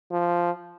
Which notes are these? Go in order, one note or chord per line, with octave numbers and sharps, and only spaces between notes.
F3